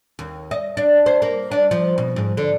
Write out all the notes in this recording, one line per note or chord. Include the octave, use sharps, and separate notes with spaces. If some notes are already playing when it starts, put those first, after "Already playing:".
D#2
D#5
D4
C5
A#3
D4
F3
B2
G#2
D3